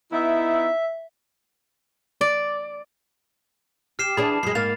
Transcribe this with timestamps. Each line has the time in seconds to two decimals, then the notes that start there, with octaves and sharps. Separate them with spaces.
0.12 B3 D#4 E4 E5
2.21 D5
3.99 G4 F6 C7 E7
4.17 E3 D4 G#4 B5
4.43 F#2 G#3 C7
4.55 G#2 A#3 F5 A6 F7